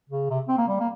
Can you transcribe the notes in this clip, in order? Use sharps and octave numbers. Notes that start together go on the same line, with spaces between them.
C#3
C3
C4
A#3
G3
A#3